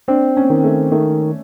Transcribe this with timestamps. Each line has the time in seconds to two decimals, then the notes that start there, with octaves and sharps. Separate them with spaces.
0.08 C4 D4
0.37 C#4
0.50 D#3
0.64 A3
0.92 D#3 A3